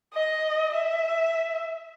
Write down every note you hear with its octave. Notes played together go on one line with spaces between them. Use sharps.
D#5
E5